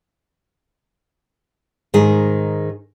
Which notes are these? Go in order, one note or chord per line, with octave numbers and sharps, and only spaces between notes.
G#2 D#3 G#4